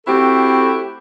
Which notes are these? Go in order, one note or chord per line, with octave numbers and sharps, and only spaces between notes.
A3 C4 E4 F#4 G4 A4